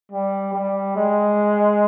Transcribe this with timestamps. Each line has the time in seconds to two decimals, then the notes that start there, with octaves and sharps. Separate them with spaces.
0.12 G3
0.53 G3
0.96 G#3